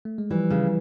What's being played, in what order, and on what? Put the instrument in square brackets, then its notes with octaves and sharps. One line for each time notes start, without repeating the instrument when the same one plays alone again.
[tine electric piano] A3
G#3
[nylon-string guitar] E3 [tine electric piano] F3 G3
[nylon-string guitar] C#3